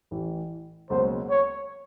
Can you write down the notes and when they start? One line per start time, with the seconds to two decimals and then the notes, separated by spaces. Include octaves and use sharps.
0.11 A1 A2 E3
0.90 C#2 B2 F#3 A#3 C#4 C5
1.30 C#5